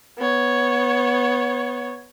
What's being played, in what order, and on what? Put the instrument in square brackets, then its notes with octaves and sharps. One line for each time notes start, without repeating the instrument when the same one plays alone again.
[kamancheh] B3 C#5